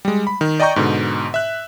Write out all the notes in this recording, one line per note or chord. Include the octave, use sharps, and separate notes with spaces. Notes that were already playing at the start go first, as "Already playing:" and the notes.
G3 G#3
B5
D#3
D5 D#5 G5 A#5 C#6 G6
G#2 B2 D3
E5 F#6